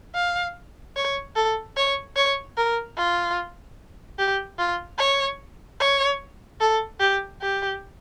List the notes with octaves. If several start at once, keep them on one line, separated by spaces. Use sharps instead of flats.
F5
C#5
A4
C#5
C#5
A#4
F4
G4
F4
C#5
C#5
A4
G4
G4